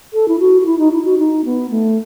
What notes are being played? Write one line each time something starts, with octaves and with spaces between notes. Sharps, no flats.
A4
E4
F#4
F#4
E4
D#4
E4
F#4
D#4
B3
A3